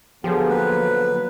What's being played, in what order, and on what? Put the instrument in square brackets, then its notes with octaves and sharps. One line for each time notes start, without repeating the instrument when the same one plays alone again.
[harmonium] D3 F#3 B3 [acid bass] F3 [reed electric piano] G4 G#4
[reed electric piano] A#3 [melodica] B4